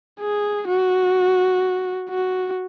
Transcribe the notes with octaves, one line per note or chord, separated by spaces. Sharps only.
G#4
F#4
F#4